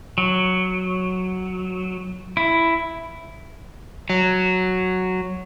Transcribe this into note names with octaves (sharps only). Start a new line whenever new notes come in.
F#3
E4
F#3